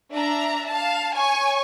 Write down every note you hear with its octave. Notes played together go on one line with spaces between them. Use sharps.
D4 E5 A#5
F5 A5
C#5 G#5 C#6